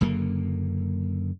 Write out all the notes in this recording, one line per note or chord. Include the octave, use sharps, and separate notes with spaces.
F#1 F#2 D3 A#3